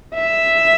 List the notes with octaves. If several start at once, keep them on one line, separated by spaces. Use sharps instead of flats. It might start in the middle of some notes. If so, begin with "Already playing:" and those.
E5